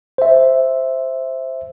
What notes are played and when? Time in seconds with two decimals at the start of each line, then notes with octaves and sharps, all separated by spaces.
0.18 C5 E5